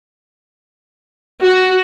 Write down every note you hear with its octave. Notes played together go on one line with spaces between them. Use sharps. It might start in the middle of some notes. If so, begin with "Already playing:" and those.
F#4